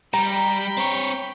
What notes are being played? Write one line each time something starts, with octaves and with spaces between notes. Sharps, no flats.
G3 G5 A#5 B5
C4 C#5